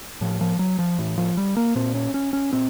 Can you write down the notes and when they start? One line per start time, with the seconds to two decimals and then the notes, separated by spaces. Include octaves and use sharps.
0.21 A2 F3
0.41 F3
0.59 F#3
0.79 F3
0.98 A2 E3
1.18 F3
1.37 G3
1.57 A#3
1.76 A#2 C4
1.94 C#4
2.14 C#4
2.33 C#4
2.53 A#2 C4